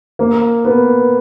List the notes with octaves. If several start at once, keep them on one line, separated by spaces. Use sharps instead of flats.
A#3
B3